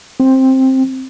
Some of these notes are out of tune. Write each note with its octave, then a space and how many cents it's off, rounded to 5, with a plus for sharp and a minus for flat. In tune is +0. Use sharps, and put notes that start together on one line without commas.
C4 +10